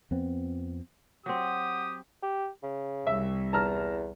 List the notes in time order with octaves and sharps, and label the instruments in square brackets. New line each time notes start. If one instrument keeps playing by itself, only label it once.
[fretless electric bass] F2 B3 C4
[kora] F#3 C4 [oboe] G4 [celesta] F#5 [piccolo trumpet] D#6
[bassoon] G4
C#3
[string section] C2 [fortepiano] E5
[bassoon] E2 [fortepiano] A5 A#5 F6